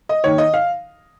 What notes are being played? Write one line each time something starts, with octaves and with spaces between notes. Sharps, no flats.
D#5
D#2 D#3 C#5
D#5
F5